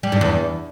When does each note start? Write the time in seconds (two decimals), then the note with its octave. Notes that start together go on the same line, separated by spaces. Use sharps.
0.03 G3
0.12 G2
0.21 E2